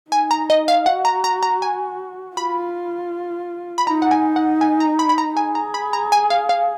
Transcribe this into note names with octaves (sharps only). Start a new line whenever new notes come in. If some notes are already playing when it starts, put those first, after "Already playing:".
D#4 G#5
A#5
D#5
F5
F#4 F#5
A#5
A#5
A#5
G#5
F4 B5
B5
D#4 A#5
F#5
G#5
F#5
G#5
A#5
B5
B5
A#5
G#4 G#5
A#5
B5
A#5
G#5
F5
F5